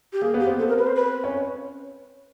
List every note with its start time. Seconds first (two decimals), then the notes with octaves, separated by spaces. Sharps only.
0.13 G4
0.22 A#3 G#4
0.34 B3
0.40 G4
0.47 C4
0.59 A4
0.69 A#4
0.78 B4
0.87 C5
0.96 B4
1.24 C#4